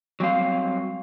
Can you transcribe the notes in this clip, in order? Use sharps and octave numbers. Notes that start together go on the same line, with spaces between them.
F#3 G3 C4 F5